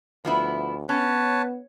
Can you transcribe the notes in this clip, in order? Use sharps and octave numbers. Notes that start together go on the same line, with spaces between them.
D2 F3 B3 E4
B3 C#4 B4 C#5 A5